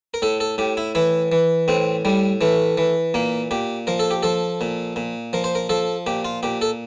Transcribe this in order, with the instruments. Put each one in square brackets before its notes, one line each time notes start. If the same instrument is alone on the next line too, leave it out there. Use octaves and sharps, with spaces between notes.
[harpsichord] A#4
A2 A4
A4
A2 G4
E4
E3 E4
E3
A2 C4
A2 G3
E3 A3
E3
A#2 A#3
A#2 G4
F3 A#4
A4
G4
F3 A4
A#2
A#2
F3 A#4
C5
A#4
F3 A4
A#2 G4
F4
A#2 G4
A4